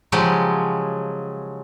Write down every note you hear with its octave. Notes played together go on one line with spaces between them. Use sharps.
C#3 F3 F#3 G#3 G4